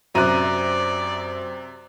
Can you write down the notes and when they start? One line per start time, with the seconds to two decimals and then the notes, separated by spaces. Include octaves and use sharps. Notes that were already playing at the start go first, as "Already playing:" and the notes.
0.15 F#2 C3 D5 E5 A#5 F#6 D#7